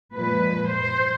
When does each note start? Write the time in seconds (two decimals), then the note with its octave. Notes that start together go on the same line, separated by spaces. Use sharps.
0.15 A#2 F3 G#3 B4
0.70 C5